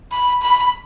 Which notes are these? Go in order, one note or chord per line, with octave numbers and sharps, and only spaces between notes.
B5
B5